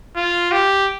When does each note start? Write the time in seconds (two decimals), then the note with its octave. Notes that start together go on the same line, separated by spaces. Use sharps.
0.16 F4
0.52 G4